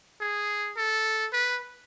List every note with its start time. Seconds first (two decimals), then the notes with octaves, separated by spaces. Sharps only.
0.21 G#4
0.77 A4
1.33 B4